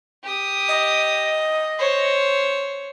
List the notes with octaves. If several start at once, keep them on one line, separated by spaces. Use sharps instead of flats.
G4 D#6
D#5
C5 C#5